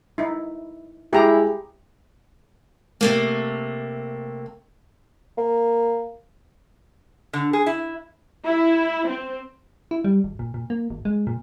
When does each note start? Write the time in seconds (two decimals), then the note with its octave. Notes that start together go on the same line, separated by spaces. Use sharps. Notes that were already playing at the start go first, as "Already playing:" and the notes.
0.18 D#4 E4
1.13 G#3 E4 G4 G#4 A#5
3.01 C3 A3 A#3
5.38 A#3
7.33 D3
7.53 G#4
7.66 E4
8.44 E4
9.09 C4
9.91 E4
10.04 G3
10.24 G#1
10.39 A#2
10.54 A#2
10.70 A#3
10.90 G#1
11.05 G#3
11.27 A#2